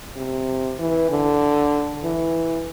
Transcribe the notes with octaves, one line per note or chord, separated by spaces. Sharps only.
C3
E3
D3
E3